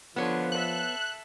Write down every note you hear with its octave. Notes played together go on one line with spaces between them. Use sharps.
D3 F3 B3 F4 C#5
A4 E5 F#6